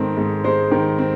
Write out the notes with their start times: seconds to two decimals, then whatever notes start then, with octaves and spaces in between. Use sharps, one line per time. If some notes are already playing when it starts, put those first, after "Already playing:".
Already playing: G#2 D#3 G#3 C4 A4
0.17 G#2
0.44 G#3 C5
0.71 D#3
0.98 C4